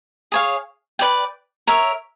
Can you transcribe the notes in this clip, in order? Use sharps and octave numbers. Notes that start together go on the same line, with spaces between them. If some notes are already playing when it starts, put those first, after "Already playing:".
G#4 C#5 F5
B4 D5 G5
A#4 C#5 E5